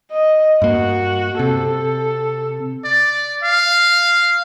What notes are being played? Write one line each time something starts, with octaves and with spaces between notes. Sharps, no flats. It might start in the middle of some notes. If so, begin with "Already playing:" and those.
D#5
G2 A#3 F#4
C3 A4
D5
F5